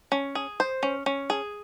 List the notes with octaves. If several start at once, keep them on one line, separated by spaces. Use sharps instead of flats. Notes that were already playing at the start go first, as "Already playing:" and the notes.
C#4
G#4
C5
C#4
C#4
G#4